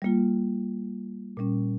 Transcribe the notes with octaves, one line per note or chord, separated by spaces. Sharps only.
G3 A#3 F4
A#2 G3 C#4